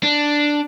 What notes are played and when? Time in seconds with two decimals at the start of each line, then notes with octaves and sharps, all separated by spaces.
0.03 D4